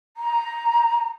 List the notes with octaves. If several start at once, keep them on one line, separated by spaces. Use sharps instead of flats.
A#5